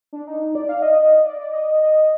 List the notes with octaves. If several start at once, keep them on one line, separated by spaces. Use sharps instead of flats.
D4
D#4
D#4
D5
F5
D#5
D5
D5
D#5
D#5